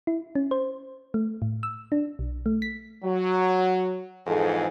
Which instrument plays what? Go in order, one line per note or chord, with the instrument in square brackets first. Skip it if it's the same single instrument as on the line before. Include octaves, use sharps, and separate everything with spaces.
[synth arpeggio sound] E4
C#4
C5
A3
A2
E6
D4
B1
A3
B6
[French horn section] F#3
F2 G#2 E3 G#4 A4